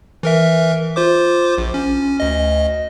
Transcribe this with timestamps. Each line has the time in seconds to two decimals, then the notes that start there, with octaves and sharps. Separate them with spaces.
0.23 E3 A#4 E5
0.96 F4 C5 D6
1.58 A#1
1.74 C#4
2.20 D2 D#5